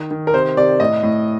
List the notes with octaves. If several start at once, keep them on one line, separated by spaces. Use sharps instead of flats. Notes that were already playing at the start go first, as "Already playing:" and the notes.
Already playing: D#3
D#3
A#4
C3 C5
C3 D5
A2 D#5
A2